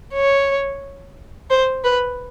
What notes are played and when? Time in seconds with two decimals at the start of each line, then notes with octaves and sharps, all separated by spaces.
0.14 C#5
1.50 C5
1.84 B4